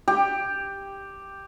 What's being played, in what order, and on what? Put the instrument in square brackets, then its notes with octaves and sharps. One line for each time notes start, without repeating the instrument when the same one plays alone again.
[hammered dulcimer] G4